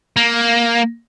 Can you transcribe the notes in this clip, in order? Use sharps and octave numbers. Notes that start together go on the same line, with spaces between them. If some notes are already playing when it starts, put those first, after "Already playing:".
A#3